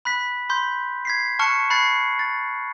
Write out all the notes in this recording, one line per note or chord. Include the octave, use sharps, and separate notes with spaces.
B5 F#6 B6
B5 C6 G6
G#6 B6 C7
A5 C#6 F6 F#6 B6 C#7
B5 F#6 G#6 A6 C7
A6